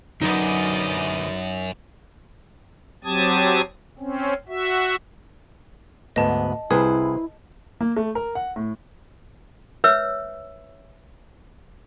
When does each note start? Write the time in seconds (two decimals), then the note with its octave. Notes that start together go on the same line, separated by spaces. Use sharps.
0.21 F#2 D3 F#3 D#4 B4 D5 D#5 B5
3.04 F#3 C4 G4 A5 D#6 G#6
3.99 C4 C#4
4.48 F#4 E5
6.16 D2 G#2 B3 D#5 A5
6.71 C2 E4 G#4 B4 C5
7.81 A#3
7.96 A3
8.15 A#4
8.35 F#5
8.56 A2
9.84 B4 C#5 E5 E6